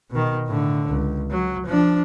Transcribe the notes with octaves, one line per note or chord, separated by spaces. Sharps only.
B2 D#3
A2 D3
C#2
F#3
F3 D4